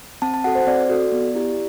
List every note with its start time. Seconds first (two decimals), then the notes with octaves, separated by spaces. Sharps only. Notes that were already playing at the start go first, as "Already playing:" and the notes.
0.22 C4 A5
0.34 A5
0.44 F#4 A4 F#5
0.55 C5
0.67 C4 D5
0.89 F#4 A4
1.12 B3
1.35 E4 G4